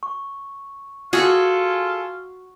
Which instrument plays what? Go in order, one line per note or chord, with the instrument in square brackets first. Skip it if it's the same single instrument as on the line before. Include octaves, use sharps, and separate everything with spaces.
[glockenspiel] C#6
[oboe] F4 [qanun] F#4 [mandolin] G#4 A4